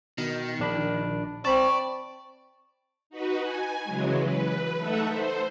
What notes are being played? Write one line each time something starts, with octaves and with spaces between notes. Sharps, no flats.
B2 D#3
A#1 D4 B5
C4 D5 A5 B5 C#6
D#4 F#4 B4
G#5
C#3 E3 F#3 G#3
B4
A3 D#4 A4 E5 F#5
C5